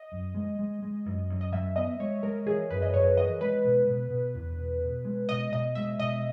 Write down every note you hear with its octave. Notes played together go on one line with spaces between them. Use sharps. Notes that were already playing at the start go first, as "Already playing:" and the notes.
Already playing: D#5
F#2
G#3
G#3
G#3
F#2
F#2
D#5
F#2 E5
B3 D#5
G#3 C#5
G#3 A#4
E3 G#4
F#2 B4
D#5
F#2 C#5
E3 D#5
G#3 B4
B2
B2
B2
E2
B2
B2
G#3
B2 D#5
B2 D#5
G#3 E5
B2 D#5